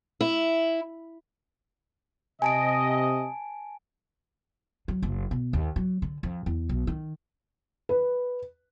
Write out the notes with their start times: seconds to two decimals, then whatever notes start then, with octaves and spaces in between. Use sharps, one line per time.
0.21 E4
2.42 C3 D#5 G#5 A5 D7
4.88 F#3
5.02 F#1
5.31 B2
5.53 D#2
5.76 F#3
6.02 D3
6.23 F2
6.46 E2
6.69 B1
6.87 D#3
7.89 B4